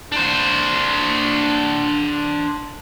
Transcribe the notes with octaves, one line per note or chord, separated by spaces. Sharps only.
D4 C5